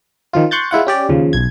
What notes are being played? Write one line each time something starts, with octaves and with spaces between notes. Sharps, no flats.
D#3 F3 F4
C6 C#6 F#6 G6 A6
G#3 E4 F4 F#5
C#4 G4 D5
D#2 C#3 F3
B1 G#6